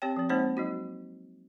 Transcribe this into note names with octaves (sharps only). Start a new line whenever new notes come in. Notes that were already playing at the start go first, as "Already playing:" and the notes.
C4 G4 C#5 G5
F3 C4
G#3 A#3 C4 D#4 C5 C#5
F#3 D#4 F#4